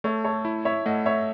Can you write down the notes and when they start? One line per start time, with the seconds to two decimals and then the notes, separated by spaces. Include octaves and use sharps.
0.04 A3 A4 C#5
0.25 A4 C#5
0.45 E4
0.65 C#5 E5
0.86 A3 D#5 F#5
1.06 C#5 E5